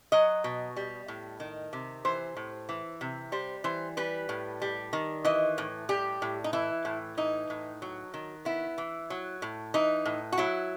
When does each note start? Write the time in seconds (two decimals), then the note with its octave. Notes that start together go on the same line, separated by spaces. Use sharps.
0.12 F#3 D#5
0.44 B2
0.77 G3
1.08 A2
1.40 D#3
1.73 C3
2.05 E3 C5
2.37 A2
2.69 E3
3.01 C3
3.32 G3 C5
3.64 E3 C5
3.97 G3 B4
4.29 A2
4.62 G3
4.93 D#3
5.25 E3 D#5
5.58 A2
5.89 G3 G4
6.22 A2
6.44 D#4
6.53 E3 E4
6.85 A2
7.17 E3 D#4
7.50 A2
7.82 F#3
8.14 D#3
8.45 B3 E4
8.78 E3
9.10 F#3
9.42 A2
9.74 E3 D#4
10.06 A2
10.32 F#4
10.38 F#3 E4